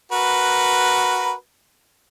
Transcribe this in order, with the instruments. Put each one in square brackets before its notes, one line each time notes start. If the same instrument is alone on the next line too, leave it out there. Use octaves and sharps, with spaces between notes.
[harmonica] F#4 A#4 B4